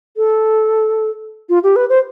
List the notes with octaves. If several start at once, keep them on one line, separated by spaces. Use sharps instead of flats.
A4
F4
G4
B4
C5